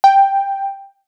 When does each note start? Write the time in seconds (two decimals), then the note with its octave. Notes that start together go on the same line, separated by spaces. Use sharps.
0.04 G5